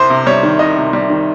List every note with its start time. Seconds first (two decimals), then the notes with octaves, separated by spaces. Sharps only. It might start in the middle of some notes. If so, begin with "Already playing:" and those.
Already playing: C2 C5
0.10 C3
0.27 G3 C#5
0.43 D#3
0.59 C2 D#5
0.77 C3
0.93 G3
1.10 D#3